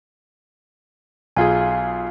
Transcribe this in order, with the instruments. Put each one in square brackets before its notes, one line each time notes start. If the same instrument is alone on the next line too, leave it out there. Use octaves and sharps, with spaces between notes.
[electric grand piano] B1 F4 G#4 [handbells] F5 G#5